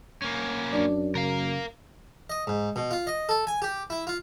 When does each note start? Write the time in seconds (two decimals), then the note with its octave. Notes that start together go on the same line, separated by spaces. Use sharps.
0.22 A#3 C#4
0.73 F#2 D4 D5
1.15 C#3 A#4 F5
2.30 D#5
2.47 G#2
2.76 B2
2.91 F4
3.07 D#5
3.29 A4
3.47 G#5
3.62 G4
3.90 E4
4.07 F4